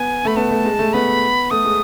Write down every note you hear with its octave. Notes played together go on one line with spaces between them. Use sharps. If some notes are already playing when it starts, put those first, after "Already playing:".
Already playing: B3 G#5
A3 B5
B3 A5
A3
G#3
A3
B3 B5
A3 D#6
G#3